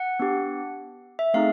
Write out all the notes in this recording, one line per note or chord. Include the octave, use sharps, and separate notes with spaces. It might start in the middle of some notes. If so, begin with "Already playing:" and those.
Already playing: F#5
B3 D4 G4
E5
A3 C4 D#4 G#4 F5